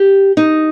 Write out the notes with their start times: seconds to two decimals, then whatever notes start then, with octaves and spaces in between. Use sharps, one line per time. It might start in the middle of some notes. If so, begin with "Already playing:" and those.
Already playing: G4
0.37 D#4